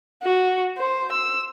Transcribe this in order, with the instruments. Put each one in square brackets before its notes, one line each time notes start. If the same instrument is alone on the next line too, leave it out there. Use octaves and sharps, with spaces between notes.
[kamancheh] F#4
C5
E6